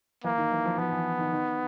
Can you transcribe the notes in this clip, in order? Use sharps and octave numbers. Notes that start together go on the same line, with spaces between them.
E3 A#3
D#3
E3
F3
F3 B3
E3
D#3
D#3